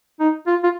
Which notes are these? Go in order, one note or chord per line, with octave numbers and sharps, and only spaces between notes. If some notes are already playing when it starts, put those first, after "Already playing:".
D#4
F4
F4